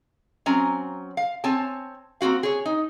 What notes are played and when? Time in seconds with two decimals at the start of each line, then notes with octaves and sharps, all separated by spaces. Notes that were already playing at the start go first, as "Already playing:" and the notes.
0.46 F#3 C4 C#4 G#5 A#5
1.17 F5
1.44 C4 C#5 G#5 A5
2.21 A#3 C4 F4 F#4 F5
2.43 G#4 C#5
2.66 D#4